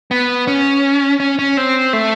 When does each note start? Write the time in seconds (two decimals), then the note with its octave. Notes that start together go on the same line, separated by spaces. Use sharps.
0.11 B3
0.47 C#4
1.20 C#4
1.39 C#4
1.57 C4
1.93 A3